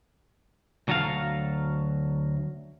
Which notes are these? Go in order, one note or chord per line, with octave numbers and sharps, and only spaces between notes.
D2 F#3 F#4 A4 F5